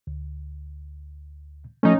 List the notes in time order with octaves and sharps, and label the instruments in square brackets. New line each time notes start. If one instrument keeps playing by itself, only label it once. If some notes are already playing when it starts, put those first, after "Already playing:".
[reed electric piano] D2
[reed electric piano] F3 A3 [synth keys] C#4 D#4